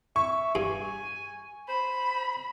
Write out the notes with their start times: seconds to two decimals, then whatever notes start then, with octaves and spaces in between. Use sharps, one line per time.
0.16 E5 C#6
0.55 G2 G#5
1.69 C5 B5